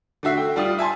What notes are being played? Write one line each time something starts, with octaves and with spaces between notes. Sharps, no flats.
D3 A3 F#4 E5 C7
G5
G3 F4 D#6
E5 G#5 A5 C6